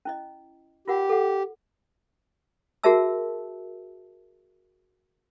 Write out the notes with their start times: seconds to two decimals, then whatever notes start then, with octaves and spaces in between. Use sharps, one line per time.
0.05 C#4 E4 D#5
0.88 F4 G4 A#4 F#5
1.09 A4 F#5
2.84 F#4 G#4 A#4 E5 A5 E6